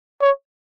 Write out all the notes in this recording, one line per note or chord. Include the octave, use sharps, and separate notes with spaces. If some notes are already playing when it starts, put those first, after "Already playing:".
C#5